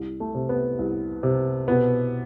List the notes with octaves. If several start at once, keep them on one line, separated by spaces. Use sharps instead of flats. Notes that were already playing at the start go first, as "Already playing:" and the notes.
Already playing: C2
A3
C3
B3
C2
C3
B2 B3